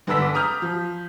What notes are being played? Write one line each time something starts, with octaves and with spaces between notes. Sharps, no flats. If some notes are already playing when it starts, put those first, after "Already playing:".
G1 D3 B4 E6 B6
D6
A#5 D#6 F6 G6
F3